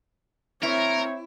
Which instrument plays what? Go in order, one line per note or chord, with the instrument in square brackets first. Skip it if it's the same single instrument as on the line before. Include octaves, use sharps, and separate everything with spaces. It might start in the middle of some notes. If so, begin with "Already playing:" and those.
[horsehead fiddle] C4 C#5 [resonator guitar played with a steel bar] E4 [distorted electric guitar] A#4